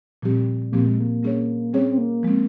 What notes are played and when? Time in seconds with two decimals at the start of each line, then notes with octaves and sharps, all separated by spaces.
0.22 A#2 F3 G3 C4 G4
0.72 A#2 F3 A#3 C4 G4
0.86 G#3
1.00 A#3
1.23 G3 C#4 G#4 C#5
1.73 G3 C4 C#4 G#4 C#5
1.90 C4
1.98 A#3
2.23 F3 G#3 C4